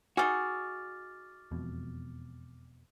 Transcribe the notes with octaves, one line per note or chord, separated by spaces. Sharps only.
D#4 F#4 G#4 D6 F6 A6
E1 F2 B2